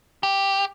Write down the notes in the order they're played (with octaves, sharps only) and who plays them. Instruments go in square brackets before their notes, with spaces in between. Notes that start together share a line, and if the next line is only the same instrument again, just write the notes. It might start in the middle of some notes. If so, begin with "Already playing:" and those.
[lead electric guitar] G4